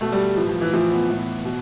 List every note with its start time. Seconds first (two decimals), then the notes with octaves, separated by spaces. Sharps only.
0.01 B2 A3
0.12 G3
0.37 E3 F3
0.40 A2
0.49 F3
0.61 E3
0.73 A2 E3 F3
0.91 B3
1.09 A2 E3
1.45 B2